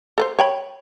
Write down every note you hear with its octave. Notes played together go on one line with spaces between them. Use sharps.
A4 B4 C5
C#5 G5 B5